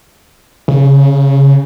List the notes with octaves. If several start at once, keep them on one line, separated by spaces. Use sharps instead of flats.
C#3